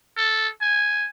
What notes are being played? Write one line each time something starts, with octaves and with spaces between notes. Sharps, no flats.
A4
G#5